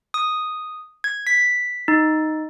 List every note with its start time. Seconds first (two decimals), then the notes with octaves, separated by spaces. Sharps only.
0.14 D#6
1.04 G#6
1.27 B6
1.88 D#4